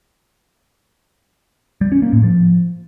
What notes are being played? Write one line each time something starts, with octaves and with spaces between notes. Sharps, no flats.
G3
C#4
A#3
A2
F3